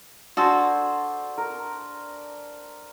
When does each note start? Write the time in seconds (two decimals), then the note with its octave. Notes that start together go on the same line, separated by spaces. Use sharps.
0.37 D4 F#4 G#4 A4 C5
1.38 A#4